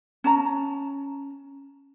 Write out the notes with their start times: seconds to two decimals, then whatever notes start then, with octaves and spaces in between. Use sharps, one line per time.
0.24 C#4 A5 A#5